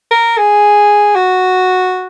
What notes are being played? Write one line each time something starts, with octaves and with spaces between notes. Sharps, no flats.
A#4
G#4
F#4